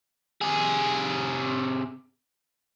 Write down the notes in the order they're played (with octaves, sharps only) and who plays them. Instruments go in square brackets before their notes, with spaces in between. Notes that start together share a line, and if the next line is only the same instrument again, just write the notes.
[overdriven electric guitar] C3 G#4